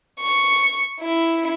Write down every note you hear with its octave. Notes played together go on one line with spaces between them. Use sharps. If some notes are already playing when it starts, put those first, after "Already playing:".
C#6
E4